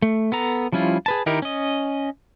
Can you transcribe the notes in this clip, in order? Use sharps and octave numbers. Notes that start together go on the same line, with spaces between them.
A3
B3 A4 A#5
F3 G3 C#4 E4 F4
G#4 B4 A5
D#3 D#4 E4 G4 A#4
C#4 D#5